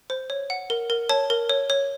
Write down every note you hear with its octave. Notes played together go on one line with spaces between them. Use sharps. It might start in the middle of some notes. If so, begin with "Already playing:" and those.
C5
C#5
F#5
A#4
A#4
C#5 A5
A#4
C#5
C#5